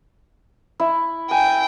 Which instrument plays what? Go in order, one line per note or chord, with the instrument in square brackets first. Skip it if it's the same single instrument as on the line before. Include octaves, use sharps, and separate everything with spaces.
[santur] E4
[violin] G5 [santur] G#5